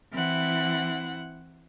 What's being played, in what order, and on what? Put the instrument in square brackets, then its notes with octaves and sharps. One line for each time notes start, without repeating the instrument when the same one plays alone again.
[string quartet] E3 C4 E4 F#5